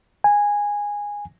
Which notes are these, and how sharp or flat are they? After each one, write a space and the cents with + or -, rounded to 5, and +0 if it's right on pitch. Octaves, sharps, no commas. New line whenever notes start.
G#5 -15